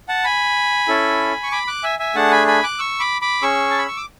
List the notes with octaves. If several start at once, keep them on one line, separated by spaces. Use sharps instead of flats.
F#5 A5
G#5 B5
C#4 E4 A4
C#6
B5 D6
D6 F#6
E5 G#5
E5 G#5
A3 D4 G#4 F#5 A5
G#5 B5
G#5 B5
D6 F#6
C#6 E6
B5 D6
B5 D6
C#4 G#4 C#6 E6
A5
B5
C#6
D6